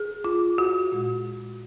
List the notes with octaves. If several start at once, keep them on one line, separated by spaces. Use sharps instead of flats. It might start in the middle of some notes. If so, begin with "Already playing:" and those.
Already playing: G#4
F4
F#4
A#2 G#3